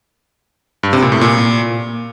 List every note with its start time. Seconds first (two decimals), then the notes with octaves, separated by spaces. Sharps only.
0.83 G2
0.93 C3
1.02 A#2
1.12 A2
1.21 A#2